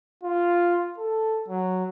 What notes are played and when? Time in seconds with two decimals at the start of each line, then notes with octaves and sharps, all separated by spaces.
0.24 F4
0.98 A4
1.48 F#3